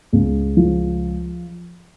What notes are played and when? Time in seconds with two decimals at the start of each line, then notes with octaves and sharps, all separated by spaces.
0.13 C#2
0.57 F3